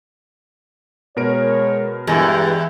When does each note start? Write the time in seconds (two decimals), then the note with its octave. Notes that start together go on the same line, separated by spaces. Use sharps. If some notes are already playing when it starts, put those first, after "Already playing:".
1.16 B2 G#3 A#4 C#5 D7
2.07 E2 G2 E3 G#3 G4